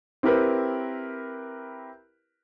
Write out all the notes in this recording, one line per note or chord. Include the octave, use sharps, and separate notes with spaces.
C4 E4 G4 A#4 B4